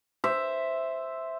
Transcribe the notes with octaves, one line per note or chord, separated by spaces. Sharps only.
C5 E5